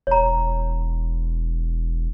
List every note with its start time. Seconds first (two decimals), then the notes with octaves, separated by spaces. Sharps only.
0.07 E1 C#5 A#5